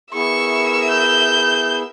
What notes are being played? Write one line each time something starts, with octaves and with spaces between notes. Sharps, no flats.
B3 E4 G#4 A#4 E5 C#6 E6
G6